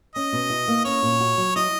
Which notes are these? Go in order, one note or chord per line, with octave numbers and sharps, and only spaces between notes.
C#4 D#5
B2
E4
A#3
C#4 C#5
A#2
F#4
F#3
E4 D#5